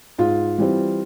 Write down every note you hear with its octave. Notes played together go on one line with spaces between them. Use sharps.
G#2 F4
E3 G3 C4